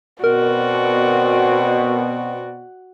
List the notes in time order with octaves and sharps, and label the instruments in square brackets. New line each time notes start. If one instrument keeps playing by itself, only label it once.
[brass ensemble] B2 [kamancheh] C4 D5 [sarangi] F#4 [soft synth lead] A#4